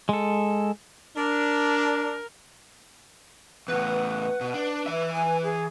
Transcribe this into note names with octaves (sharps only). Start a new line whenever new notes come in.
G#3 A4
D4 A#4
E2 A2 B4 F#5
B2
D4
E3 E5
G#5
G#4